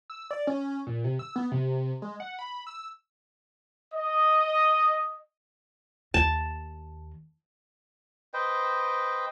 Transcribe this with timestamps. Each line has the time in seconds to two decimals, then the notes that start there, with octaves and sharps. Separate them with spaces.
0.10 E6
0.31 D5
0.47 C#4
0.87 A#2
1.04 C3
1.19 E6
1.36 B3
1.52 C3
2.02 G#3
2.20 F#5
2.39 B5
2.67 E6
3.94 D#5
6.14 D#2 A5
8.34 B4 C5 D#5 G5